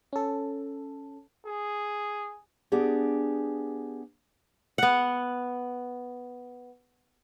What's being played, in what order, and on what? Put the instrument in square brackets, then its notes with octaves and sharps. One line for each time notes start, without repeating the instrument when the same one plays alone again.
[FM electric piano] C#4 A4
[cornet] G#4
[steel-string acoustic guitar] B3 D4 G4 G#4
[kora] B3 F#5